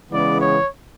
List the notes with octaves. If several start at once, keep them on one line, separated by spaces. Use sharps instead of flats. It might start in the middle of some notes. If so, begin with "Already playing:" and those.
C#3 E3 G#3 B3 D5
C#5